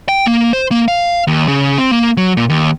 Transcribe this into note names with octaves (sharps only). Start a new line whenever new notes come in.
G5
A#3
C5
A#3
F5
D#2
C#3
C4
A#3
F#3
A#2
D#2